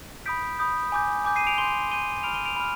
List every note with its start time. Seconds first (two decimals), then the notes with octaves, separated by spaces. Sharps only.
0.26 B5 D#6 G6 B6 D7
0.59 B5 D#6 G6
0.92 G#5 D6 G6
1.25 G#5 D6 G6
1.36 C7 D#7
1.47 D7 F7
1.58 C6 G7
1.61 G6
1.75 G7
1.91 C6 G6 D#7 G7
2.23 B5 F6 D7 F7
2.34 D#7 G7
2.45 D7 F7
2.56 B5 F6